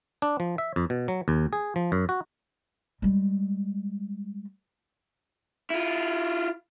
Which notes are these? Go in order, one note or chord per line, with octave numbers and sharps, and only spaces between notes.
D4
F3
E5
F2
B2
F#3
D#2
G#4
F3
F#2
F#4
G3 G#3
E4 F4